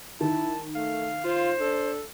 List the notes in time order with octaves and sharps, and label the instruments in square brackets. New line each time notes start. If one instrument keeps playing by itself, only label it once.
[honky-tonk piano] D#3 [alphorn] E4 [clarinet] A5
[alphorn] A3 [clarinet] F5
[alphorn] F4 [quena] C5
[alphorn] D4 [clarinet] A4